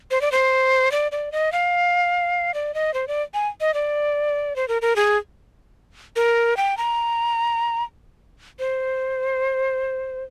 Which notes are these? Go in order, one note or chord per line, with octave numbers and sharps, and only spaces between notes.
C5
D5
C5
D5
D5
D#5
F5
D5
D#5
C5
D5
G#5
D#5
D5
C5
A#4
A#4
G#4
A#4
G5
A#5
C5